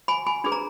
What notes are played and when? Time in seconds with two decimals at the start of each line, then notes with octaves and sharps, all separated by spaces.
0.08 G#5 B5
0.27 G#5 B5
0.44 D4 G#4 B4 B5
0.52 A#5